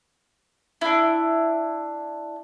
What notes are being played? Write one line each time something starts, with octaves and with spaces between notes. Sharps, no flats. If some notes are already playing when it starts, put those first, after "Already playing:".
D4 E4